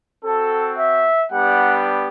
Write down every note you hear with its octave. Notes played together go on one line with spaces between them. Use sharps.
C4 F#4 A4
E5
G3 B3 D4 G4 F#5